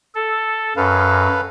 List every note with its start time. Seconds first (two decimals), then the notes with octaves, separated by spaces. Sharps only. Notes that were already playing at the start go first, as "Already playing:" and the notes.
0.15 A4
0.77 F#2 A4 B4 F5